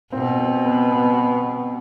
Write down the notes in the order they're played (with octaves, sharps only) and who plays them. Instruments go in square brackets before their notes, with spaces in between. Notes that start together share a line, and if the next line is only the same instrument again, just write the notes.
[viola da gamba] B2 [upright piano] C4
[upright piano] C4
B3
B3